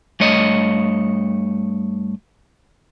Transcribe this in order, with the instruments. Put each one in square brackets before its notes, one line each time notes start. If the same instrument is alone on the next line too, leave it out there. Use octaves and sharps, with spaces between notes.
[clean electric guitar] G2 A3 C#5 D#5